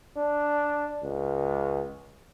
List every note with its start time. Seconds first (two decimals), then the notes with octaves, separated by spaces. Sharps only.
0.17 D4
1.03 C#2